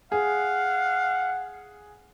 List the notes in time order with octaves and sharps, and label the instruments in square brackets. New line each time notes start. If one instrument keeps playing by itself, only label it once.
[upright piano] G#4 [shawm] F5 [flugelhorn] F#5